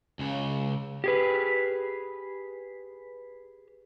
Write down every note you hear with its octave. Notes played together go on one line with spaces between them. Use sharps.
C#2 C#3
G4 G#4 B4